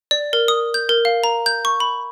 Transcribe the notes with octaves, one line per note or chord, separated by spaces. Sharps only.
D5
A#4
D#6
G6
A#4
F5
A#5
G6
C#6
B5